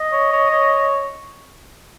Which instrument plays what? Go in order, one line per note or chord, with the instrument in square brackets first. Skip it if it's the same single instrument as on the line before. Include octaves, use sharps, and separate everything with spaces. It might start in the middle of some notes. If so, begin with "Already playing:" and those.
Already playing: [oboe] D#5
[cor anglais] C#5
C#5
C#5